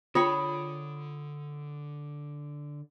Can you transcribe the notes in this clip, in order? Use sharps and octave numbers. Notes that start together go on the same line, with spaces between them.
D3 F4 G#4 C#5 G5 B5 C#6 D#6